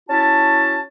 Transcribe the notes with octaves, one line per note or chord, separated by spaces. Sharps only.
C#4 E4 F#4 A5